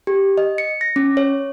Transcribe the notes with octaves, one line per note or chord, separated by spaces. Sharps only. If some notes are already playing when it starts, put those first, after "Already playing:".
G4
D#5
C#7
A#6
C#4
C#5